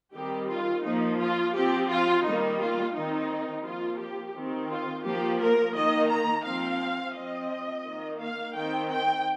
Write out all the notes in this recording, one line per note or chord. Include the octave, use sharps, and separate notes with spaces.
D#3 G3 C4 G4
F4
F3 A#3 D#4
F4
F3 C4 G4
F4
D#3 G3 A#3 D#4
F4
D#3 C4 D#4
F3 A#3 F4
G4
D#3 C4
F4
F3 A#3 G4
A#4
D#3 A#3 D#5
A#5
F3 C4 F5
F3 C4 D#5
D#3 A#3
F5
D#3 C4 G5
G5